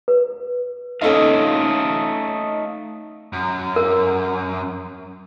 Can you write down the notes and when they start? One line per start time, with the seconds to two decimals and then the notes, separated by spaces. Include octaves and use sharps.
0.08 B4
1.01 A3 C#4 D#4 A4 D#5 F5
3.33 F#2
3.76 A#4